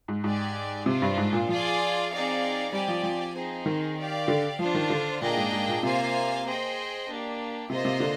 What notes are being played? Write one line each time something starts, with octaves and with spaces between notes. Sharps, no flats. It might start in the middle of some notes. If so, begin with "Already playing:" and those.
G#2
G#2 G4 D5 G#5
C3 D4 F4 C5
G2
G#2
A#2
F3 F4 G#4 D5 G#5
C4 D#4 G#4 D5 F5
G3 C4 G4 D5 G#5
F3
F3
C4 D#4 G#4 C5
D#3
G4 D5 F5
D3
F3 D4 F4 C5
D#3
D3
A#2 A#3 D4 G#4 D#5 G5
G#2
G#2
A#2
C3 A#3 F4 C5 F5 G#5
G#4 C5 D#5 G5
A#3 D4 G4
C3 A#3 F4 C5 D#5
C3
D3